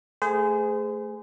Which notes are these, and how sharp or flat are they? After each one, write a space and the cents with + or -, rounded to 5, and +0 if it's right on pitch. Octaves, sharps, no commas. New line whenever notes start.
A3 +0 G#4 +0 C5 -35